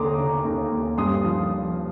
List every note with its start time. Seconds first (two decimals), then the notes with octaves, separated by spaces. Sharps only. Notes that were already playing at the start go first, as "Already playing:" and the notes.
Already playing: D#2 D3 A#5 C6 D6 D#6
0.18 D3
0.45 D#2
0.72 D#2
0.98 G2 C6 D#6
1.24 F3